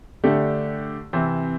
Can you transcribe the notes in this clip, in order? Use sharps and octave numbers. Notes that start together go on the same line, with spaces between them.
D3 A3 D4 G4
C3 E3 C4